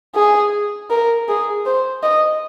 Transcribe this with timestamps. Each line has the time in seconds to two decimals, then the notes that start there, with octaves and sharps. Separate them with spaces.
0.16 G#4
0.91 A#4
1.29 G#4
1.66 C5
2.03 D#5